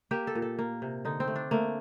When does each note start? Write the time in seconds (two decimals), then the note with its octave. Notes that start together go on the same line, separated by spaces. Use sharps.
0.11 A#3 G4
0.27 A4
0.35 A#2
0.42 A4
0.59 A#3
0.82 C3
1.05 D3 D#4
1.20 C4
1.28 A3
1.36 D4
1.51 A3 A#3